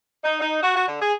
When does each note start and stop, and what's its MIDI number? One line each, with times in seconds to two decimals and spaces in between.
0.24 0.38 63
0.40 0.58 63
0.62 0.75 66
0.75 0.85 66
0.87 0.99 50
1.01 1.12 68